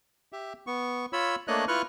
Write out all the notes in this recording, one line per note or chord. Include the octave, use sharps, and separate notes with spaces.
G4 E5
B3 C#6
F4 C#5 B5 E6
A3 A#3 D4 C#5 D#5 F#6
E4 F4 B4 C#6 F6 F#6